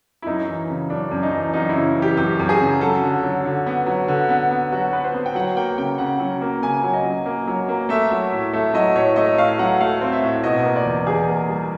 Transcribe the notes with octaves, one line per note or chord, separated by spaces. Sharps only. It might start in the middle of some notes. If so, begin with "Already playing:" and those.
E4
F#2 D#4
E3
C#3
F#2 D4
F#2
D#4
E3
F#2 D#4
E4
C#3
E3
G4
F#2 G4
F#2
G#4
C#3
F#3 A4
D3
F#3
D3
B3
F#3
D3
B3
B3
F#3 F#4
B3 B4
C5
B3
G5
F#3 F#5
A#3 G5
C#3 G5
C#3 F#5
F#3
A#3
C#3 G#5
F#3
D#5
F#3
A#3
F#3
A#3
A3 E5
F#3
A2
A3 E5
F#3 D#5
A2 C#5
A3 D#5
A2 F5
F#3 F#5
A3 F5
C4
E5
A2
B2 D#5
A#3
D5
E2
E2 G#4
A#3
G3